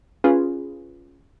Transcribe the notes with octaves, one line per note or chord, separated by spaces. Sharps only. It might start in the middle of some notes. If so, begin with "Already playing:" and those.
C#4 F4 G#4 B4